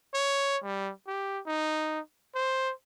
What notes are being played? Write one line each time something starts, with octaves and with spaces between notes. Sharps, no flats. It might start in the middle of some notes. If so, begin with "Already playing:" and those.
C#5
G3
G4
D#4
C5